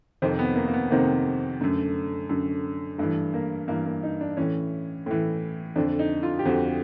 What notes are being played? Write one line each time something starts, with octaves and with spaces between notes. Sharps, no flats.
F2 C3 D#3 C4
B3
A#3
A#3
B3
F2 C3 D#3 A#3
F#2 D3 A3
F#2 D3
G2 E3 A3
A#3
G2 E3 A#3
A#3
D#4
D4
A2 E3 C#4
A2 E3
F2 D3 D4
D#4
F4
G4
F2 D3 F#4